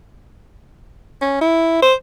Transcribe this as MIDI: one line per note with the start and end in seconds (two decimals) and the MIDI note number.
1.21 1.38 61
1.41 1.78 64
1.82 1.94 72